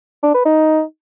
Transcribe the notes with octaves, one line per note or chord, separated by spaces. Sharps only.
D4
B4
D#4